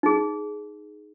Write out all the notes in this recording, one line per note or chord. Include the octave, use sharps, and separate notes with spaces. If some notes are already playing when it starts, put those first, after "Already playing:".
D#4 G#4